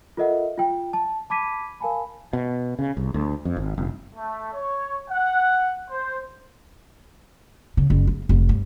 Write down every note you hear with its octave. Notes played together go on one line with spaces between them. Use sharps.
F4 A4 A#4 D#5 E5 F#5
F4 G5
A5
A5 B5 D6 G#6 B6 D#7
A#4 F5 G#5 A5 B5
B2
C#3
C2
D2
F2
G#1
F1
A3
C#5
F#5
C5
C#3
F#1
A#3
F1
G2